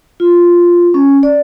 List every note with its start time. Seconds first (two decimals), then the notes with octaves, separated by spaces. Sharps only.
0.20 F4
0.94 C#4
1.23 D5